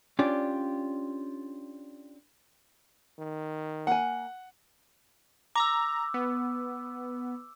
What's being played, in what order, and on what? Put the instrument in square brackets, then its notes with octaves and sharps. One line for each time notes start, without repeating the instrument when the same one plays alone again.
[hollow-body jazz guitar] C#4 D4 F4 G4 D5
[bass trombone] D#3
[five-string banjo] A#3 G#5 [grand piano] F#5
[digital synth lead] A#5 [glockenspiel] D6 E6
[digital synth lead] B3